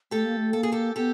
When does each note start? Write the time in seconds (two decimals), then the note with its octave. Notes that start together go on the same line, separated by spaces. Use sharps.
0.11 A3 G4 A4
0.25 A#3
0.37 A3
0.53 A#3 A4
0.63 G#4
0.72 G4 A4
0.96 B3 G4 A4